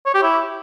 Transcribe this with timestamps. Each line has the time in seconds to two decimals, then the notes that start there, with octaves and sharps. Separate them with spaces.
0.06 C#5
0.14 G4
0.23 E4